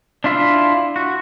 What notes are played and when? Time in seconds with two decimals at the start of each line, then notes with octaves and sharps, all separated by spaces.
0.24 D4 E4 F4 E5
0.96 F#4